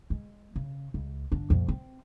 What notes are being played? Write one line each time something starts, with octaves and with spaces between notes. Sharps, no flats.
G#3
C#3
C#2
G1 D4
F2 A#2
C4